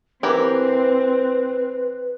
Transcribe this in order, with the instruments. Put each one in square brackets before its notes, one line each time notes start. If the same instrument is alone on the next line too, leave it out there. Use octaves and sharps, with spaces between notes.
[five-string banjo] E3 G4 A#4 [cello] C4 [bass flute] B4